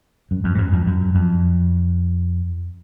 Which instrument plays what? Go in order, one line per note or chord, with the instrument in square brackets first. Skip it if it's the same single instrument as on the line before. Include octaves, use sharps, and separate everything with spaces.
[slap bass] F#2
F2
G#2
F#2
F2
F#2
F2